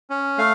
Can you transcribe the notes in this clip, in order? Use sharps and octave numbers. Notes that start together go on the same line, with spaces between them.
C#4
A3 F5